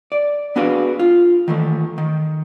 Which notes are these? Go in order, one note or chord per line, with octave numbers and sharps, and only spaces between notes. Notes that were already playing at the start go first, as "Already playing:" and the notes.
D5
B3 D4 F#4 G#4 B4 F5
F4
D#3 E3 A3
D#3